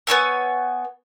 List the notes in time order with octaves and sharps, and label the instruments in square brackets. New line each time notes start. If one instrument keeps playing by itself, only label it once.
[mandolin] B3 C#5 G#5 E6